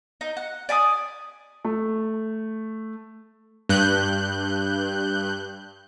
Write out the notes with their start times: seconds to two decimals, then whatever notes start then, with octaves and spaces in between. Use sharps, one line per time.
0.21 D#4
0.37 F#5
0.69 D5 G#5 B5 D#6
1.65 A3
3.69 G2 F#6 G6